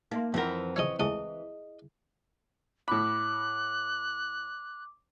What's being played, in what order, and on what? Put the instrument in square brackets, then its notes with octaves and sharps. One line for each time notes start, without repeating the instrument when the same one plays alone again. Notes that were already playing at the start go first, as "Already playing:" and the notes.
[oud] A#3 [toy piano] D#4 E5 C6
[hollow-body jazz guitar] F2 A#4 [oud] E3 C4 [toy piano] F5 F#5
[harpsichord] C#3 F3 E4 [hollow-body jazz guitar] C#5 D#5
[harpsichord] C#2 A3 [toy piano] E4 G#4 E5 [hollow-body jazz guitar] D#5
[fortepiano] A2 B5 [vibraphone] D6 [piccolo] F#6